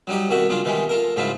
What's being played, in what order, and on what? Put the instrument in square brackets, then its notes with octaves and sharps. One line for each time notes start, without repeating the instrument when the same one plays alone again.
[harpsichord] F#3 G3 D#4 G4
C2 B2 D#3 F#4 A4
C#3 F#3 D4 F4
B2 D#3 E3 G3 G#3
F4 A4 A#4
G#2 C#3 F#3 E4 F4